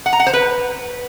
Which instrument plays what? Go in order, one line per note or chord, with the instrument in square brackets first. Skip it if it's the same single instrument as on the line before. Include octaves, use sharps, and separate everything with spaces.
[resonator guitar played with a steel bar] F#5
A#5
F#5
C5
B4